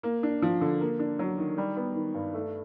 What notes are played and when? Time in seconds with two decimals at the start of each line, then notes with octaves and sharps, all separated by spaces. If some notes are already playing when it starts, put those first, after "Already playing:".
0.03 A#3
0.23 D4
0.42 F3
0.61 D3
0.81 A#3
0.99 D4
1.19 F#3
1.38 D#3
1.58 G3
1.76 B3
1.95 D#3
2.14 G2
2.34 A3